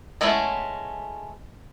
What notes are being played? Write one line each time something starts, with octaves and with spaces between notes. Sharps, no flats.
G#3 A3 B3 C#4 E4